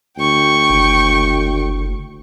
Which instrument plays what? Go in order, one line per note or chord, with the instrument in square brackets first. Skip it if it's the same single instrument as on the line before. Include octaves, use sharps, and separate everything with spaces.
[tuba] D2 [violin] G5 C#6
[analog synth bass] F#1